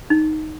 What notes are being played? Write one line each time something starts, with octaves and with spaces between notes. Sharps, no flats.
D#4